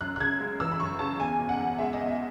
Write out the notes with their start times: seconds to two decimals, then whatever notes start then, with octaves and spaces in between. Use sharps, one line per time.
0.01 F#2 F#6
0.16 F#6
0.20 C#3 G#6
0.40 G#3
0.60 E3 E6
0.72 B5
0.80 F#2 C#6
0.99 C#3 A5
1.20 E2 G#5
1.39 B2
1.49 F#5
1.59 E2
1.78 G#3 E5
1.93 E2 D#5
2.08 E5